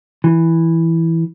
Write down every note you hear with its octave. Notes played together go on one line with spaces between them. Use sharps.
E3